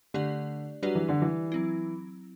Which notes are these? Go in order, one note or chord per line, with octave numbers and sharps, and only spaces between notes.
D3 A3 D4 G4 D5
F#3 G3 D4 G4 B4 D5
E3
D3
E3
F#3 C4 E4